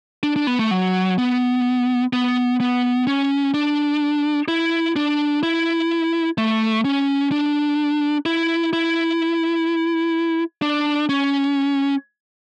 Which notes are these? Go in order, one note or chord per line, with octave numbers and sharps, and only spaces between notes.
D4
D4
B3
A3
F#3
B3
B3
B3
C#4
D4
E4
D4
E4
A3
C#4
D4
E4
E4
D4
C#4